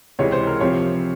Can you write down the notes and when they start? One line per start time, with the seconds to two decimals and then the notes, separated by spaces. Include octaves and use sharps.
0.19 C#2 C3 E3 G#3 C#5
0.32 C5
0.47 A#4
0.60 C3 F3 C4 C#5